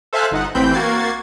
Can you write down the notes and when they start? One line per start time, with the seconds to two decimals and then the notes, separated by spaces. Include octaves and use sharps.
0.13 A4 C5 E5 F5 G#5 F#6
0.31 G1 D#4 F#5
0.55 A1 E3 C4 G5 B5 G6
0.73 A#3 F#4 G#6 A6 C7